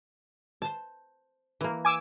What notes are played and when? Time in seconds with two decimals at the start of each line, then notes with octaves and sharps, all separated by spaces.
0.62 C5 A5
1.61 E3 A#3
1.85 G#5 D6 E6